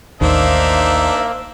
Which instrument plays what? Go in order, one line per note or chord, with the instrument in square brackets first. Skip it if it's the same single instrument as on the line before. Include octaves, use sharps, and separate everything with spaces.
[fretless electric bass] A1 D#2 [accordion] A#3 [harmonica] D4 D#4 E5 [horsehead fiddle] C5 F5